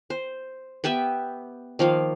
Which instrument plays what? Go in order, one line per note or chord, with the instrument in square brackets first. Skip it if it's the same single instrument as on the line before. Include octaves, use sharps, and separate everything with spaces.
[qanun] C5
B3 G4 B4 E5
D#3 F3 A#3 F5